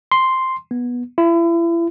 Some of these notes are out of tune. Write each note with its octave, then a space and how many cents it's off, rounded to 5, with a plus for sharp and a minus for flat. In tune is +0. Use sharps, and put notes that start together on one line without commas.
C6 +0
B3 -15
E4 +35